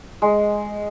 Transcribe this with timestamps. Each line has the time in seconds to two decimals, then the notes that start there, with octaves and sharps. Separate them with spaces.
0.22 G#3